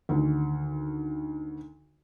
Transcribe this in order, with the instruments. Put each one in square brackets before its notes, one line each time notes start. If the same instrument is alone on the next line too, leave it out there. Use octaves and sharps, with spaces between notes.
[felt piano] D2 D#3